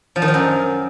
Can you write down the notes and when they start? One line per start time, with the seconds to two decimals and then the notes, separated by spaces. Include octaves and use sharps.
0.16 F3
0.22 D#3
0.28 F3
0.34 F#2